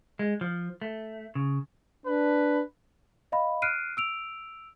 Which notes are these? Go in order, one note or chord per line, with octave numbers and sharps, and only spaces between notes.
G#3
F3
A3
C#3
D4 B4
D#5 F5 B5
F6 F#6 C7 D7 D#7
E6 D7 F7